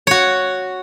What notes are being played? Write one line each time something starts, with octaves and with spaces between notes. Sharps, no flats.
F#4 C#5